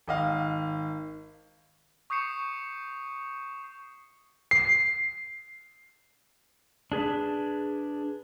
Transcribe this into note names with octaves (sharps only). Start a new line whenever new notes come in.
G#1 D#5 F5
C#6 D#6 G6 C7 C#7 E7
C7
D4 G#4 B4